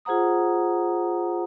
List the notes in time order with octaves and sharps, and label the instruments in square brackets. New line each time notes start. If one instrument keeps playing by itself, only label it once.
[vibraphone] F4 G#4 C5 F#5 A#5 D#6